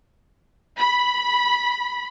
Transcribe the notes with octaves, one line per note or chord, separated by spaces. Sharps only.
B5